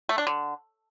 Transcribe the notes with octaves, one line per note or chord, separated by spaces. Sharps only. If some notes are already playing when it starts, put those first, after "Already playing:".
A3
D4
D3